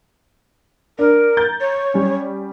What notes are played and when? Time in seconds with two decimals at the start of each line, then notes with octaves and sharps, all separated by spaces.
0.99 D4 A#4
1.37 A#5 G6 A6
1.60 C#5
1.94 G3 C#4